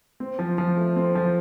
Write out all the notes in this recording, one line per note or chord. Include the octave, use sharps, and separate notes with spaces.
C4
F3
F3
A3
C4
F3